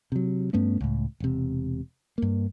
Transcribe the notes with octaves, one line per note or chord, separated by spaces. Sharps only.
C3 F#3
G2 A3 B3 C#4
C#2 A2
E1 C3
G2 A#3